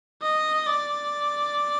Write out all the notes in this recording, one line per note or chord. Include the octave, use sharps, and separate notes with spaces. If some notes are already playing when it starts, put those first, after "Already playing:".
D#5
D5